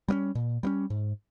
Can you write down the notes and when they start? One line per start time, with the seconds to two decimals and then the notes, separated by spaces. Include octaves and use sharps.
0.08 G3 A#3 C#4
0.35 A#2
0.63 G3 A#3 C#4
0.90 G#2